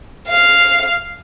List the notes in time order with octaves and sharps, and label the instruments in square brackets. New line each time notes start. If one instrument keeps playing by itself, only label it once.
[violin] F5